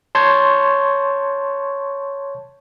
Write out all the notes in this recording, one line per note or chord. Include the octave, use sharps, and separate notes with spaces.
C#5 A5 C6 C#6 G6 G#6